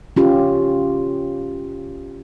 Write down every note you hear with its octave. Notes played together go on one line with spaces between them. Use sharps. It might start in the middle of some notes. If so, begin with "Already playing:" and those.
C#4 F4 G4